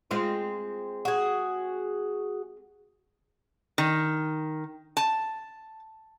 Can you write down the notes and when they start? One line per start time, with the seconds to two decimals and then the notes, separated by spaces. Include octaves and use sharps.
0.11 G#3 C4 F4
1.05 F#4 G#4
3.78 D#3
4.97 A5